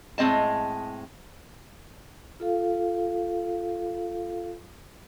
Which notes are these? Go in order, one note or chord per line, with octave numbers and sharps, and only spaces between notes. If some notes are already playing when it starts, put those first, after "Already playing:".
A2 G#3 C4 D#5 A5
F4 A4 F5